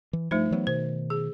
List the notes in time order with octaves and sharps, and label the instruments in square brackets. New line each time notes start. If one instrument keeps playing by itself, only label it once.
[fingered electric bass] E3
[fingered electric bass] G2 F3 [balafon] A3 D#4 C5
[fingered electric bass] E3 F#3 B3
[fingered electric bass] B2 D#3 [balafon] C5
[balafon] G#4